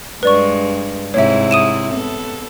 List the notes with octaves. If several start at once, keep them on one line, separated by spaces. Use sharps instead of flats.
G2 G#3 B4 D5 C#6
G#2 C3 E4 C#5 E5
D#6 D#7 E7
B3 A4